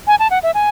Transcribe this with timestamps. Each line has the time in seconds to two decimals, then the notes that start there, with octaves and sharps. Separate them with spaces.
0.07 G#5
0.19 A5
0.31 F#5
0.43 E5
0.54 G#5